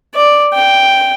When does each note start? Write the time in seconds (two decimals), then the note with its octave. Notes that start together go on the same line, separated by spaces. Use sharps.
0.15 D5
0.54 G5